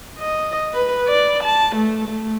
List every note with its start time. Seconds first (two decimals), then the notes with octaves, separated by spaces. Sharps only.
0.18 D#5
0.74 B4
1.07 D5
1.44 A5
1.76 A3
2.08 A3